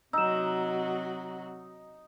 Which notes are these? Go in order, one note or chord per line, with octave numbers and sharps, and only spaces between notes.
C3 F#3 D#4 F#4 E6 E7